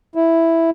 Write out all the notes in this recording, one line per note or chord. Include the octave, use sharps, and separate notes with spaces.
E4